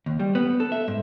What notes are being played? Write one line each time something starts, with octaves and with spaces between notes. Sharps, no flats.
D#2
G3
B3
A4
E5
G#2